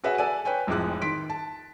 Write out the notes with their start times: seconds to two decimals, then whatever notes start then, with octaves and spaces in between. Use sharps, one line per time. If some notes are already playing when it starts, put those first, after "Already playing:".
0.04 F#4 G#4 B4 C#5 E5 F#5
0.18 A4 D5 G#5 D#7
0.45 B4 C#5 G5 G#5
0.67 F1 F2 A2 G#3 D6 F#6
1.01 D#3 C6 B6 D7
1.30 A5